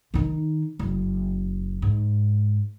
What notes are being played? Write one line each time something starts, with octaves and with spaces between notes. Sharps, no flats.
D#3 D#4
F#1
G#2